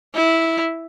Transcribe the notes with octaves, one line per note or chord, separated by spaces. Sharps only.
E4